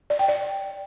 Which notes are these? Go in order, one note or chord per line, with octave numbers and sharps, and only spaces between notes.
D5
G5
D5